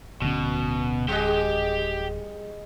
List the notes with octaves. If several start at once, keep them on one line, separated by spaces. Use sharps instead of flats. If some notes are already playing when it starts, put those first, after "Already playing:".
D1 B2 D3 C#4
G3 G4 G#4 D#5 G5